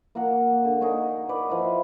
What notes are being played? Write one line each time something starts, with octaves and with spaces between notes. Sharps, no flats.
A#3 F#4 A#4 F#5
D3
D#4 G#4 A#4 C#5
B4 D5
F3 E4 D#5